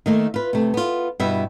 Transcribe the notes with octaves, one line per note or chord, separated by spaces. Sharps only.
D#3 A3 A#3
F4 B4
C3 A3
B3 F4
G2 B2 B3 E4 E5